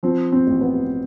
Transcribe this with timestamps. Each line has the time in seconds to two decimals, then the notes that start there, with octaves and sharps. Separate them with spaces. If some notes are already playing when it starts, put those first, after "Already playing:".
0.03 F3 C4
0.32 C4
0.47 A1
0.61 B3